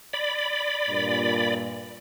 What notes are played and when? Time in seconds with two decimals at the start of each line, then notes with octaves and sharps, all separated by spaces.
0.13 D5 B5
0.89 G2 A#2